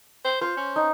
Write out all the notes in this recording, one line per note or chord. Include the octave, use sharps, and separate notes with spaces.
C5
F4 C5
C#4
D#4